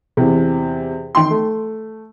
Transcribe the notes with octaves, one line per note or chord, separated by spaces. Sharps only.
E2 C3
D#3 G5 C6
A3